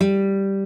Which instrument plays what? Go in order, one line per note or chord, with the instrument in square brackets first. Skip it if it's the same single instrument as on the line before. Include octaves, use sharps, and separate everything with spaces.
[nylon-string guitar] G3